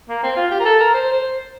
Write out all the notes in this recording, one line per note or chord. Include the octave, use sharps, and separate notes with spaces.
A#3
C4
F4
G4
A#4
A4
A#4
C5
C5